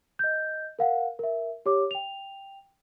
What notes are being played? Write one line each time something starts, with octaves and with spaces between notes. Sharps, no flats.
D#5 G6
A#4 F5 F#5
A#4 E5
G4 C#5 D6
G5 F7